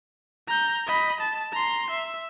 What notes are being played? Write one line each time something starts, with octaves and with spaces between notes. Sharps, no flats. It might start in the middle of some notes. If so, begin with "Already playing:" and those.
A#5 G6
D#5 B5
A5
A#5 C6
E5